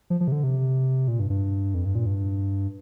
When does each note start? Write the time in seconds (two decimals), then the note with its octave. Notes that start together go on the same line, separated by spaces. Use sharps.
0.10 F3
0.20 F3
0.28 C3
0.32 D3
0.43 C3
1.08 A#2
1.20 G2
1.30 G2
1.74 F2
1.85 G2
1.95 A#2
2.06 G2